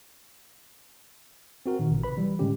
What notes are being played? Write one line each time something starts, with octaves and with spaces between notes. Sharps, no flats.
C4 F#4 A#4
A#2 D#3
A1 C3
B4 B5
E3 F#3 G3
A2 D3 G#3 C#4 G4